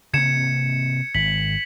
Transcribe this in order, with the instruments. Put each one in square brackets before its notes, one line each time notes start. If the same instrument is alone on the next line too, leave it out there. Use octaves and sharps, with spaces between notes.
[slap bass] C3 A#3 C4 [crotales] G#6 C#7 E7
[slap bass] G#1 [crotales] B6 F#7